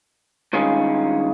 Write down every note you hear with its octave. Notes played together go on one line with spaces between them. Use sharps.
G2 D#3 G#3 C#4 F4